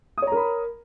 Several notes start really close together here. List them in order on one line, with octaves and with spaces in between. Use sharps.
D#6 C#5 A#5 A#4 B5